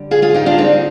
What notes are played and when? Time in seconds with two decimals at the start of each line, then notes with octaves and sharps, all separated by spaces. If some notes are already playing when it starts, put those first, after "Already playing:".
Already playing: D3 G3
0.11 F4 G#4
0.22 F4 G#4
0.34 D#4 G4
0.46 D4 F4
0.58 C4 D#4